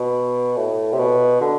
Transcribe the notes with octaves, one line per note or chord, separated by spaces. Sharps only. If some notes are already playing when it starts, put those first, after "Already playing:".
Already playing: B2
A2
C3
B2
D3